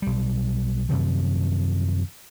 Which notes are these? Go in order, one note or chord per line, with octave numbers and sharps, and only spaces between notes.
B1 G3
F#2 C3 D#3 F3